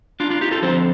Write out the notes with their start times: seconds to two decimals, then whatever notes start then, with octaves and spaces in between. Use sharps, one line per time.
0.20 D4 F4
0.30 D4 F4
0.41 D#4 G4
0.51 F4 A4
0.62 D3 F3 C4 A4 C5